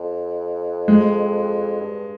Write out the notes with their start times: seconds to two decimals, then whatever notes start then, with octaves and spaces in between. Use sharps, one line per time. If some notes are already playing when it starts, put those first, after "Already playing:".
Already playing: F2
0.88 G#3
1.81 G2